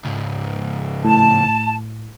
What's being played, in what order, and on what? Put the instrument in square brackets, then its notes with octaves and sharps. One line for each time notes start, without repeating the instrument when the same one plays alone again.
[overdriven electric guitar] C#2 G#2
[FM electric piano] A2 [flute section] A5